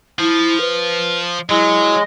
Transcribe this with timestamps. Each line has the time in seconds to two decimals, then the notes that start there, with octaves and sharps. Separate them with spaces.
0.19 F3 E4
0.60 B4
1.49 F#3 G#3 E4